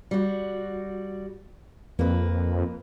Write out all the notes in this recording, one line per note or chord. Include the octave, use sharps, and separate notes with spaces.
G3 F#4
F2 A#3 B4